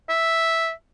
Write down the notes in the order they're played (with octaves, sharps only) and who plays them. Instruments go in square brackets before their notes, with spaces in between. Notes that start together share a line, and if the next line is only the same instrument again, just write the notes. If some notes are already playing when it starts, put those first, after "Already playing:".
[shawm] E5